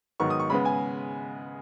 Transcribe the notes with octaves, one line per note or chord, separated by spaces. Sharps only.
G#2 D#3 F#3 B3 D#4 C#6
D#6
C#6
C#3 G#3 B3 B5
G#5